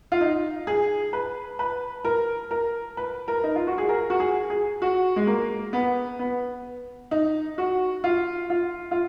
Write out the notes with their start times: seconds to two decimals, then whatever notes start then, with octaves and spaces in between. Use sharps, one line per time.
0.12 F4
0.21 D#4
0.67 G#4
1.13 B4
1.59 B4
2.05 A#4
2.51 A#4
2.97 B4
3.28 A#4
3.44 D#4
3.55 F4
3.67 F#4
3.78 G#4
3.89 A#4
4.10 F#4
4.20 G#4
4.50 G#4
4.82 F#4
5.16 G#3
5.27 A#3
5.73 B3
6.19 B3
7.11 D#4
7.58 F#4
8.04 F4
8.50 F4
8.91 F4